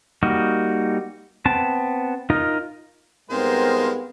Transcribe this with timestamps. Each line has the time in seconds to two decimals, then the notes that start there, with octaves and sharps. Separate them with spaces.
0.23 G3 A#3 D#4 F#4
1.45 B3 C4 A5
2.30 D#4 F4 A#4
3.30 G#2 G3 G#3 B3 C4 F4 A#4 C5